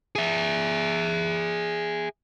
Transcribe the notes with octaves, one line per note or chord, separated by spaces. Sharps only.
G#4 E5